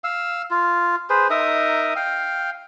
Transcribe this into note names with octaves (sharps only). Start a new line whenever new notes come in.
F5 E6
F4
G#4 B4 C5
D#4 A#4 E5 D#6
F5 G5